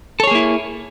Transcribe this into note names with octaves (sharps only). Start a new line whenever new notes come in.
A#3 E4 G#4 A4 C#5